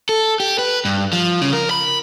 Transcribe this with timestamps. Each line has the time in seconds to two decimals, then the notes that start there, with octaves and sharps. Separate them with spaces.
0.09 A4
0.40 G4
0.59 B4
0.85 G2
1.13 F3
1.41 C#3
1.53 A#4
1.71 B5